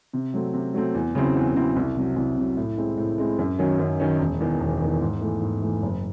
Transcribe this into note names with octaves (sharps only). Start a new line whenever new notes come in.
C3
F#3 A3 C4
C3
F#3 A3 C4
E2
C#3 F#3 C4 E4
E2
C#3 F#3 C4 E4
C2
C3 F#3
C2
C3 F#3
A2
G#3 C4 E4
A2
G#3 C4 E4
F#2
D#3 F#3 C#4
F#2
D#3 F#3 C#4
E1
E2 D#3
E1
E2 D#3
G#2
E3 A3
G#2
E3 A3
F#1